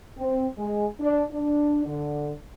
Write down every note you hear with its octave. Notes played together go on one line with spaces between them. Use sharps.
C4
G#3
D4
D4
D3